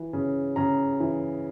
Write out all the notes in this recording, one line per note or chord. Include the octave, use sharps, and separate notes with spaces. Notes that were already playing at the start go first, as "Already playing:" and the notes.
Already playing: E3
C#3
C#3 A#5
E3